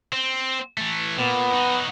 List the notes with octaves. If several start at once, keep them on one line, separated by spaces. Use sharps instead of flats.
C4
E3 A3
A#2 B3
D#4 F#4